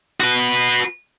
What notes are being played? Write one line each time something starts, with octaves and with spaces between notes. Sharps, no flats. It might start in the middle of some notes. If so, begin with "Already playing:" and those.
F#4 B4